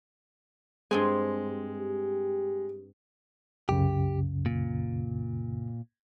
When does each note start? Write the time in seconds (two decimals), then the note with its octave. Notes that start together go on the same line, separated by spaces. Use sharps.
0.91 G2 G#3 C4 G#5
1.78 G4
3.69 C2 F#2 C#3 G4
4.46 A#2